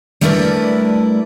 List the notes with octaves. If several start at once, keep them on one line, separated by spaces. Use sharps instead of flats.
G3 A3 D4 E4 A#4 B4